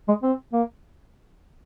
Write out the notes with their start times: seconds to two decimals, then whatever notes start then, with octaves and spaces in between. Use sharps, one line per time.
0.08 G#3
0.23 C4
0.53 A#3